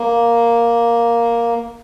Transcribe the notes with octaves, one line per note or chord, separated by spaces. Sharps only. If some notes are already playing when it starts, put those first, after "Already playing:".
Already playing: A#3